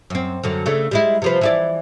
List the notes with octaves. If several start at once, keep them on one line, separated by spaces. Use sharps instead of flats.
F#2 C4
F#2 D3 F#3
C#3 A3 D4
G3 G#3 E4
C3 F3 B4
E3 E4 D5